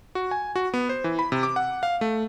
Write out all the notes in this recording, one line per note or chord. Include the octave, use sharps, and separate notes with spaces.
F#4
G#5
F#4
B3
C5
E3
B5
C3
D6
F#5
F5
A3